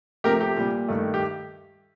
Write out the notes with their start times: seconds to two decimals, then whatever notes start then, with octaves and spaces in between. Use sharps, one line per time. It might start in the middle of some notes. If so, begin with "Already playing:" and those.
0.24 C3 F3 A3 G4 A#4
0.41 G4
0.57 A#2 G3
0.89 G2 D#3 A3
1.14 G4